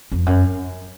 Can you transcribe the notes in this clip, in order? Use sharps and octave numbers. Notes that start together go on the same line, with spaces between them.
F2
F#2